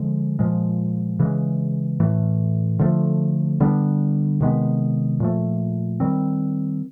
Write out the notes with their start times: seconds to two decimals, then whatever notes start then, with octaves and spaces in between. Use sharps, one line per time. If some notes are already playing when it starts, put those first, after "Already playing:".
Already playing: D3 F3 G#3
0.39 A#2 F3 G#3
1.19 C#3 E3 G#3
2.00 A2 E3 A3
2.79 D3 F3 A3
3.60 D3 G3 B3 D4
4.41 C3 D#3 G#3 B3
5.20 A#2 F3 A3
6.00 D#3 G3 C4